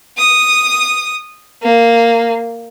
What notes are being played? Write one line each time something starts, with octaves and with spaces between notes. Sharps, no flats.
D#6
A#3